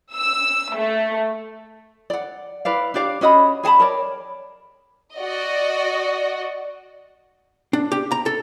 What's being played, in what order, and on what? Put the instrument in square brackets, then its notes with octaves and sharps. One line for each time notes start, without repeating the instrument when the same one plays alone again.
[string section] E6
A3
[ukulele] D5 F#5
E4 B4 D5 F5
D4 G4 D5 F5
C#4 F#4 D#5 B5
G#4 G#5 A5 B5
A#4 C#5 D5
[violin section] F#4 D5 D#5
[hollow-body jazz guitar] D4
G4
A#5
A4